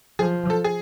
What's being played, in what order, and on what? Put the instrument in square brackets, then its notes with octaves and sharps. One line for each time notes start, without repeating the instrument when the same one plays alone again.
[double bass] F3 [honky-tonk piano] G#4
[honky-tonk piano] A4
G#4